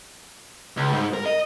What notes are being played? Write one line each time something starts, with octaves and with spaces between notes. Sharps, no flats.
C#2
G#2
A#4
D#5